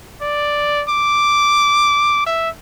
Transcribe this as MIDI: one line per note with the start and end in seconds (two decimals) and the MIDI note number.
0.22 0.84 74
0.89 2.23 86
2.26 2.49 76